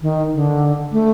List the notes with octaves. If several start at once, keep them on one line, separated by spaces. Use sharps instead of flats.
D#3
D3
A3